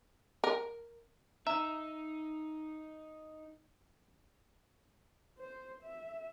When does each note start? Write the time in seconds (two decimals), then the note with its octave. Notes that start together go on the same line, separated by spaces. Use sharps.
0.44 A#4
1.47 D#4 E5 A#5
5.38 C5
5.83 E5